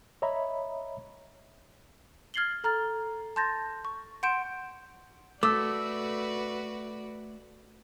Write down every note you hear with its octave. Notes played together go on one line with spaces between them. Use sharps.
C#5 D#5 E5 A#5 B5
F6 G#6 A6 C7 F#7 G7
A4 A#5 F6 A6
A5 C6 G6 A6 A#6
C#6
F#5 C6 G6 D7 E7
A3 F#4 B4 D5 D6 E6